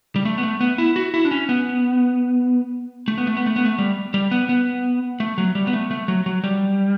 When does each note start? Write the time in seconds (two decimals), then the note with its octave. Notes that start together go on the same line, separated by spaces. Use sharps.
0.16 G3
0.25 A3
0.38 B3
0.43 A3
0.61 B3
0.78 E4
0.96 F#4
1.14 E4
1.25 D4
1.31 C#4
1.49 B3
3.08 A3
3.18 B3
3.27 A3
3.37 B3
3.46 A3
3.56 B3
3.65 A3
3.79 G3
4.14 G3
4.31 B3
4.49 B3
5.20 A3
5.38 F#3
5.55 G3
5.67 B3
5.73 A3
5.91 A3
6.08 F#3
6.26 F#3
6.44 G3